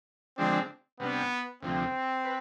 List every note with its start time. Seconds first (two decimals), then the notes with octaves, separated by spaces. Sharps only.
0.37 D3 F3 G#3 C4 D4
1.00 C3 G3 B3 D4
1.62 D2 C3 F3 C4
2.25 B4